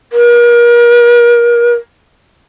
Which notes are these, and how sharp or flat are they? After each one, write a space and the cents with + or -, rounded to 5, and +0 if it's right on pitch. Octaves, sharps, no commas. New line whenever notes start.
A#4 +35